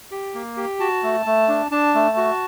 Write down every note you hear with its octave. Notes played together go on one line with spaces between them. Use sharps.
G4
A#3
G4
F#4 A5
A3
A3
D4
D4 A5
A3
F#4